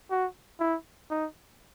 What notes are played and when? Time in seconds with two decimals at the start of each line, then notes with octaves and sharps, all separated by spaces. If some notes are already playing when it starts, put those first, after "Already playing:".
0.11 F#4
0.60 E4
1.11 D#4